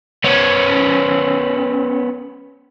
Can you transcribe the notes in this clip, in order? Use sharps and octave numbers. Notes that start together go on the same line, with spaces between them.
B3 C#4